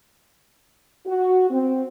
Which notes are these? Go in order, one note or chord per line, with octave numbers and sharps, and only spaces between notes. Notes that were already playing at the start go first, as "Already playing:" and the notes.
F#4
C4